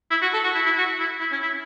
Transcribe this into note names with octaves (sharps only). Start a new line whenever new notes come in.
E4
F#4
A4
F#4
E4
E4
F#4
E4
E4
C#4
E4